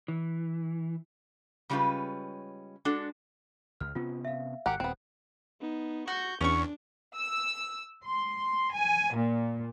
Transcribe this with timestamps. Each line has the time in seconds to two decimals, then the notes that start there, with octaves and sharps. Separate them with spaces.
0.08 E3
1.70 C#3 G3 G#3 C#4 F4 B4
2.85 G#3 D4 F#4 A4
3.81 C#2 F6
3.95 C3 B3 C#4 F4
4.25 E5 F5
4.66 G#1 G4 A#4 F#5 F#6 C#7
4.80 D#1 B3 C4
5.60 B3 D#4
6.08 F#4 C#6 G6
6.41 E2 C#4 D4 C#6
7.16 E6
8.06 C6
8.74 G#5
9.15 A#2